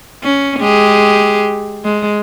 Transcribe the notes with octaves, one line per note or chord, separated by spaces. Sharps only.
C#4
G#3 G4 G#4
G#3